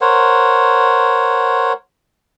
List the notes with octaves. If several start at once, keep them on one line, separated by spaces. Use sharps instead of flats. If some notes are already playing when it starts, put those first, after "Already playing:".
A#4 C5 C#5 F#5